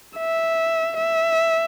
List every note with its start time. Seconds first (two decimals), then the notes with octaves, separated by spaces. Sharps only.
0.18 E5
0.97 E5